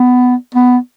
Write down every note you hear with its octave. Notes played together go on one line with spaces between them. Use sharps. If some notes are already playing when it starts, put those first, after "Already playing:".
Already playing: B3
B3